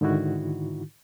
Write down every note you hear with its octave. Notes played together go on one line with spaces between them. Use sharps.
G#2 D3 D#3 D#4 E4 F#4